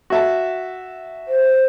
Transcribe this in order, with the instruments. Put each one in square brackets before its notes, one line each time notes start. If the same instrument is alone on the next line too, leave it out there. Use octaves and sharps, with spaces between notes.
[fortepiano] F#4 E5 A5
[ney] C5